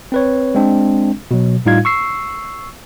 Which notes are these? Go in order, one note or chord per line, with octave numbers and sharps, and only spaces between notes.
C4 B4 C#5
G#3 C4 D4
B2 F#3
A2 G3 D#4 F4 F5 G#6
C#6 E6 C7